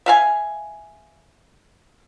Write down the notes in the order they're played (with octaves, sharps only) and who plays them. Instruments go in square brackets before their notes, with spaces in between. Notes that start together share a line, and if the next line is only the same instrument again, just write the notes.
[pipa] E5 F5 G#5